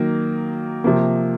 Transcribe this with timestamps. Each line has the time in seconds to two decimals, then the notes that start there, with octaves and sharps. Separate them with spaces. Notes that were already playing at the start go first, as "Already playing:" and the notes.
Already playing: D#3 F#3 A#3
0.84 C3 F3 A#3